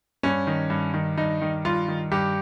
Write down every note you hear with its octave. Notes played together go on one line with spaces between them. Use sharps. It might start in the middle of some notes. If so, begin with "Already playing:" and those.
G2 C#4
D#3
G2
D#3
G2 D#4
D#3
G2 F4
D#3
G2 G4